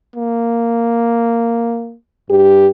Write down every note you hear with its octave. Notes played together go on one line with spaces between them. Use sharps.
A#3
G2 G4